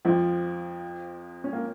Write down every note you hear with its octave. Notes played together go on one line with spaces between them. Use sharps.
F2 F3
C#4
A#3